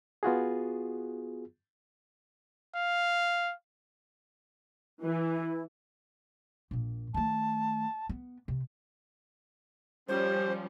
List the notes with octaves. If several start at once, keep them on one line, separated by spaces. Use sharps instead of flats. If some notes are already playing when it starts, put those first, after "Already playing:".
B3 F4 F#4 G#4
F5
E3 E4
A#1 A#2
D#3 A3 A5
B3
C3
F3 G3 C#4 C5